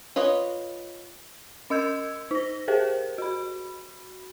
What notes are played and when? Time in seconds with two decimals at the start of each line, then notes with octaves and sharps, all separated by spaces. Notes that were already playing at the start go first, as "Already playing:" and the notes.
0.16 F4 B4 C#5 D#5
1.70 C#4 D#5 E6 G6 G#6
2.31 D#4 A#6
2.68 G4 G#4 A#4 C5
3.18 F#4 B5